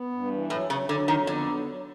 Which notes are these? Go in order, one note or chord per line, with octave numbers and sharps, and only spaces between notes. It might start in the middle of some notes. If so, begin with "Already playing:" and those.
Already playing: B3
G2
E3
A2 F#3
C#3 F#3
D3 F#3
F2 D#3
D3 B3
F#3
F#3